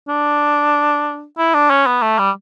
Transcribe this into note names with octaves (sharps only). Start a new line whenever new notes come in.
D4
E4
D4
C#4
B3
A3
G3